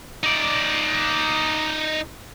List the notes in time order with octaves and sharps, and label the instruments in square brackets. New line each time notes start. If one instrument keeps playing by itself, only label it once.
[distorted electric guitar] D#4 D5